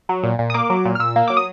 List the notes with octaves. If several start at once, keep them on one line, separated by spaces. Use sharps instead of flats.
F#3
A#2
A#2
D#6
A#3 D6
F#3
A#2
F6
A#2 E6
A#3
F#3 D6
D#6